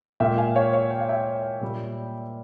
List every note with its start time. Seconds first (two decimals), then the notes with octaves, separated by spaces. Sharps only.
0.20 A#2 G#3 E5 G5
0.38 F5 G#5
0.56 C#5 F5
0.73 C#5 F5
0.91 G5
1.00 F5
1.09 E5 G5
1.61 A#2 G3 A#3